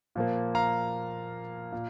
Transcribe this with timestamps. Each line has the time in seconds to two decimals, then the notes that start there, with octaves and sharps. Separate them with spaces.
0.15 A#2 F3 A#3
0.55 F5 A#5
1.72 A#2